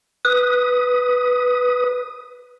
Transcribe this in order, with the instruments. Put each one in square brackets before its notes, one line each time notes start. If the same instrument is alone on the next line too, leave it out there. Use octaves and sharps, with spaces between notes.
[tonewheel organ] B4 D#6